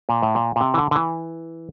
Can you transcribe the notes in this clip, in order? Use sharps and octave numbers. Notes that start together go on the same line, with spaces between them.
A#2
A2
A#2
A#2
C3
E3
D3
D3
E3